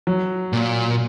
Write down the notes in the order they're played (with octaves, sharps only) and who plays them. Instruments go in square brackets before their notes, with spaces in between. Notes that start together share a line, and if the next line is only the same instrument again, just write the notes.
[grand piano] F#3
[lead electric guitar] A#2